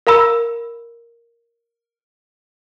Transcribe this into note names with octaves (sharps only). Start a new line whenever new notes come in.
A#4 F5 A#5 B5 E6